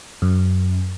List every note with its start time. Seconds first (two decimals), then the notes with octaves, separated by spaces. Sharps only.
0.22 F#2